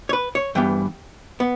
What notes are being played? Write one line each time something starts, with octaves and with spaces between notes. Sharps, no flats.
C#5
B4
C#5
G2 E3 B3 G5
B3